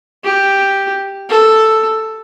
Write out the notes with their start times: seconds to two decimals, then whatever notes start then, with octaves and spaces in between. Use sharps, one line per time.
0.24 G4
1.29 A4